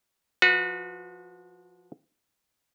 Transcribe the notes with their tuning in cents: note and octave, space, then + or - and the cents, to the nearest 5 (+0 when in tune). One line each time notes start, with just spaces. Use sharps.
F3 -5 F#4 -30 B4 +0